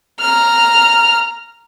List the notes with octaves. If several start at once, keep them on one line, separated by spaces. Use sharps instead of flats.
A#5 F6